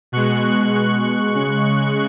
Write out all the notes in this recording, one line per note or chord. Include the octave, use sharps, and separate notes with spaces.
B2 G#3 C#6 F#6
C#6 F#6
B2 G#3 C#6 F#6
C#6 F#6
C#3 G#3 C#6 F#6